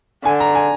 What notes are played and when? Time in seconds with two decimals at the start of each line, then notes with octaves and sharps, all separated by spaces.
0.25 D3 G#5
0.40 A#5
0.55 G#5